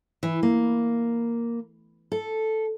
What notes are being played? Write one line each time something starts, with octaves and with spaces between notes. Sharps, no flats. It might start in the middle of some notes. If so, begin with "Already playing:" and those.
E3
A#3
A4